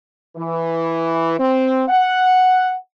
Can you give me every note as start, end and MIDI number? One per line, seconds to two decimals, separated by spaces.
0.37 1.36 52
1.39 1.84 60
1.89 2.74 78